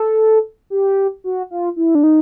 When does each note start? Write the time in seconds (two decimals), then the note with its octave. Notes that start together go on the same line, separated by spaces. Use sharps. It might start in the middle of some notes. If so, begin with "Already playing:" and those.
Already playing: A4
0.70 G4
1.24 F#4
1.51 F4
1.76 E4
1.95 D4
2.03 D#4